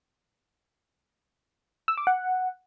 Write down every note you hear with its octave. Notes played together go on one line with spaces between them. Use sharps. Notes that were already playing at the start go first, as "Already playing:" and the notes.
E6
D6
F#5